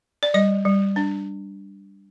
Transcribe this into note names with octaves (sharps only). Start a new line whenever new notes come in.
D5
G3 D#5
G3
D4